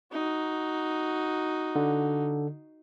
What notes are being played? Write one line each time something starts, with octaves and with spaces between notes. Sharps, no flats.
D#4 F#4
D3